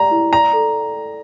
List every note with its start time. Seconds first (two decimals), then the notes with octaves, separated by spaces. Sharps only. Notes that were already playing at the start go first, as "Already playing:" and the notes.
Already playing: G4 D5 A5 A#5
0.11 E4
0.32 D5 A#5
0.53 A4
0.74 G5
0.94 A4